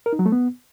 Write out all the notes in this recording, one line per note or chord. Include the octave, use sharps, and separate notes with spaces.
A#4
D#4
F#3
A3
B3